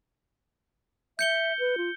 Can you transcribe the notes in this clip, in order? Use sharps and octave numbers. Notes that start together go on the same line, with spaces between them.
E5 G6 C#7 G7
B4
F4